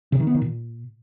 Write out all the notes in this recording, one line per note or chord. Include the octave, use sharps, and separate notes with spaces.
C3
D#3
B3
D#3
A#2